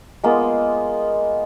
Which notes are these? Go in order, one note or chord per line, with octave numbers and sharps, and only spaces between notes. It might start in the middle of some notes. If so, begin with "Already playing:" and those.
G#3 A#3 B3 F4